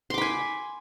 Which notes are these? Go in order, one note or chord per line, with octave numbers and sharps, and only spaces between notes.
G#5 B5 C6 D6